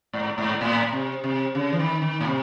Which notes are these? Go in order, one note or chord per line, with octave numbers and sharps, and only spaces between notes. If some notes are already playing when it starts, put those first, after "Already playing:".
G#2
G#2
A2
C3
C3
C#3
E3
D#3
D#3
A2
C3